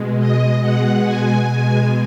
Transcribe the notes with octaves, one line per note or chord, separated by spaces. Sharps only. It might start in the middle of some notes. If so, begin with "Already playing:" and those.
Already playing: B2 G#3
D#5
B2 G#3 F#5
G#5
B2 G#3 G#5